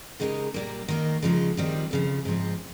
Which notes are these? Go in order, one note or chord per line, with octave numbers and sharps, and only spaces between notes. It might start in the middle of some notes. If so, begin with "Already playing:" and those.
C#3 G#3 D#4 G4 A#4
A#2 G3 A#3
D#3 A#3 D#4
C#3 F3 G#3 D#4
D#3 G3 C4 F4
F2 C#3 F3
G#2 F3 C4